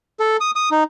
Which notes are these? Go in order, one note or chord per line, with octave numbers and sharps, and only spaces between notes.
A4
D#6
D#6
D#4